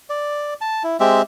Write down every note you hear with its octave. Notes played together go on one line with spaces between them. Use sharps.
D5
A5
E4
G#3 C4 G4 E5